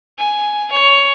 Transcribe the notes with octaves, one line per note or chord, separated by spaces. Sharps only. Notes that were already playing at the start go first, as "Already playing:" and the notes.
G#5
C#5